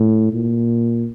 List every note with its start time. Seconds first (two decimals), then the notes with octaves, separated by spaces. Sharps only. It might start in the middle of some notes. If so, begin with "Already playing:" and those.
Already playing: A2
0.33 A#2